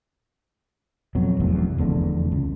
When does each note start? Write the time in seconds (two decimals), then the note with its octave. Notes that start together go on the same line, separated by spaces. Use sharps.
1.15 F2 B2 F#3
1.40 F1 B1 E2
1.78 F1 E2 D3
2.32 C#2